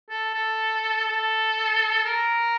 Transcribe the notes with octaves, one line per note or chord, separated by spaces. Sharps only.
A4
A4
A4
A#4